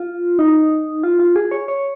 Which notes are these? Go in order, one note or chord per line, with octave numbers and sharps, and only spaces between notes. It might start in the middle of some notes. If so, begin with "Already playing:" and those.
Already playing: F4
D#4
F4
F4
G#4
C#5
C#5